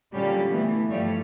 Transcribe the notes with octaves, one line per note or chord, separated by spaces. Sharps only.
A#2 D3 F#3 G3 C#4 G4
E3 A3 B3
G2 F3 G3 A3 G4 C#5